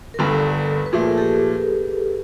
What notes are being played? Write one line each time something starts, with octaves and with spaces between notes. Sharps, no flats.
A#4
G1 G2 D3 A4 B4
B4
A#2 F3 A3 G#4 A#4
A#4
G4 A4